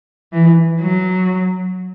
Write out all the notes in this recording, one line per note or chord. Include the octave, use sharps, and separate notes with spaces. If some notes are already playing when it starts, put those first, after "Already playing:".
E3
F#3